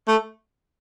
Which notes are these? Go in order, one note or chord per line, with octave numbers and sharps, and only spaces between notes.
A3